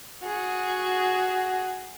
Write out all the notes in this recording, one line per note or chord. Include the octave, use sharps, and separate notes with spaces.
F#4 G#4